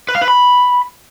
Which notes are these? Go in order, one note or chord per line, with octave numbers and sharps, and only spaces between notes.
B4
F5
B4
B5